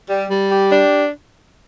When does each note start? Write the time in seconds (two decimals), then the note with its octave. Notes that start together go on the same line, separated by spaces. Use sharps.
0.09 G3
0.30 G3
0.51 G4
0.72 D4